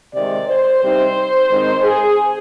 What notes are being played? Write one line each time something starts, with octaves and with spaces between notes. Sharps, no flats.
C3 D#3 G#3 D5
C5
C3 G3 C4 D#4 C5
D#3 G#3 C4 D#4
G#4